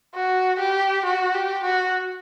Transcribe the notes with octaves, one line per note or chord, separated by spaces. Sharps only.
F#4
G4
F#4
G4
F#4